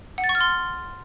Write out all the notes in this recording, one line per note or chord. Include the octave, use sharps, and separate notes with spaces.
F#5
A6
C#6
F6
C6